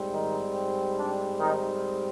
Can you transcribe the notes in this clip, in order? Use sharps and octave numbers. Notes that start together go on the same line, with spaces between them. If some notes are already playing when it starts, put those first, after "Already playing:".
Already playing: G#2 G3 C4
D#3 D#4
D4
D#3 D#4